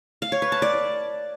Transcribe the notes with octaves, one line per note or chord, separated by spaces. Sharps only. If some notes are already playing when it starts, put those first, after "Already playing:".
F5
C#5
B4
A5
D5